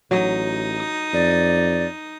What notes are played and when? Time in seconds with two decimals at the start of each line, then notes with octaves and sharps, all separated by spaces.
0.11 A1 F#3 D#4 D#6
1.14 F2 D5